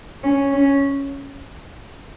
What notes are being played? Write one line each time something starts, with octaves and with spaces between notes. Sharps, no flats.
C#4
C#4